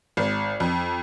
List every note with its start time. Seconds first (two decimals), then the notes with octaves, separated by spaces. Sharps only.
0.17 G#1
0.60 F2